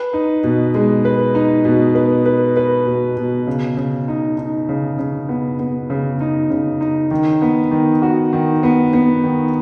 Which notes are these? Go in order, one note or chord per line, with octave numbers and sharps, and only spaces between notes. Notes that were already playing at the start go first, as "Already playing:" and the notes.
Already playing: B4
D#4
B2
G#3
B4
D#4
B2
B4
B4
B4
B2
B2
C#3
C#3
D#4
D#4
C#3
C#3
B3
B3
C#3
D#4
C#3
D#4
D#3
B3
D#3
F#4
D#3
B3
B3
D#3